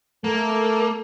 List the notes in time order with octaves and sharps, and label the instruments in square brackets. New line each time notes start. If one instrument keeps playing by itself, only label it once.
[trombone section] A3 A4 [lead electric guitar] A#3